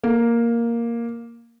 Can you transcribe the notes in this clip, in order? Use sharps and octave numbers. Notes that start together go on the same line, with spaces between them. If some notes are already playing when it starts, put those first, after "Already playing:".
A#3